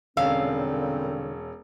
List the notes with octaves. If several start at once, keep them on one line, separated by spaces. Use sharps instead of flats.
E1 A#2 D3 G3 C4 C#4 F5 E6